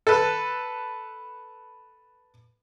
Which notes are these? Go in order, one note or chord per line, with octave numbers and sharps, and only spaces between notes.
A4 B4